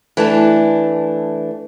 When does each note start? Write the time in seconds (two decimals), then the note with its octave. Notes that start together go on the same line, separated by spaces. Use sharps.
0.17 E3 A3 D4